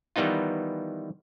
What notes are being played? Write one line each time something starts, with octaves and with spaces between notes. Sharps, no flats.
D#3 E3 G3 B3 D#4 F4